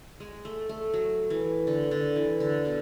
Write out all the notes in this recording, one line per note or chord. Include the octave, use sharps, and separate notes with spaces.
G#3
A3
A3
F#3
E3
D3
D3
E3
D3
B2